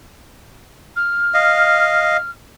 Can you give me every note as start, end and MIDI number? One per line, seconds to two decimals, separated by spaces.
0.96 2.30 89
1.34 2.17 75
1.34 2.17 77